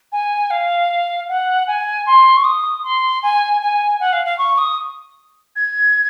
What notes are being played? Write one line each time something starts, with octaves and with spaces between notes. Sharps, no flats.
G#5
F5
F#5
G#5
C6
C#6
D#6
C6
G#5
G#5
F#5
F5
F5
C#6
D#6
G#6